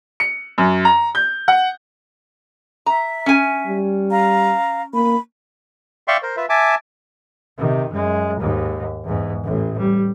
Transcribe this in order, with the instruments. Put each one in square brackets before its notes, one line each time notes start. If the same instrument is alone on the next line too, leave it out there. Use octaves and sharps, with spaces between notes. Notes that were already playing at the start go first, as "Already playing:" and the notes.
[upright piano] C#7
F#2
A#5
G6
F#5
[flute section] E5 [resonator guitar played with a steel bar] A#5
[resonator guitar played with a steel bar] C#4 G#5
[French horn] G3
[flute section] F5 A#5
[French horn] A#3 [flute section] B5
[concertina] D5 E5 F5 G5 C6 C#6
A#4 C5
F4 B4 E5
E5 G#5 A5 D6
[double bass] C3 D#3
F#2 G#3
D#2 G#2
E2 G#2
A1 A2
G3